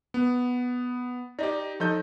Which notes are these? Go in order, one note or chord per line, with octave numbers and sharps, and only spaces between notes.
B3
D#4 G4 D5 D#5
F3 D#4 A4 D#5 G6